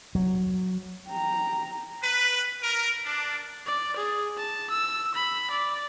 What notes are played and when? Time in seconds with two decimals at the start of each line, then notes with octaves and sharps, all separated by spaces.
0.15 F#3
1.07 G5 A#5
2.03 B4
2.63 A#4
3.05 D4
3.66 D5
3.96 G#4
4.37 A5
4.70 E6
5.15 B5
5.51 D5